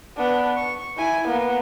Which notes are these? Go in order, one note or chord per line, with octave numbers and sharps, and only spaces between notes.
B3 D4
C#6
E4 G#5
A#3 B3